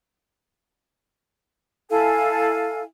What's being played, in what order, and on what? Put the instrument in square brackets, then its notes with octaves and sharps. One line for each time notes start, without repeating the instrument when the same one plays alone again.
[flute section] E4 A4 F5 G#5